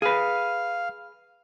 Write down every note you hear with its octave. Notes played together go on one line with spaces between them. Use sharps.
G#4 B4 F5